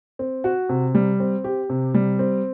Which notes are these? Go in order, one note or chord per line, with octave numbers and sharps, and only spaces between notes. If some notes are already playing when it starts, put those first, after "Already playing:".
C4
F#4
C3
G3
C4
G4
C3
G3
C4